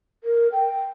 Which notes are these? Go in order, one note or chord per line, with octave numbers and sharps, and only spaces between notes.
A#4
G5